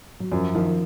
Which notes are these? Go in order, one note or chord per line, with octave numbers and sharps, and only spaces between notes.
F#3
F#2 F3
D#3 F3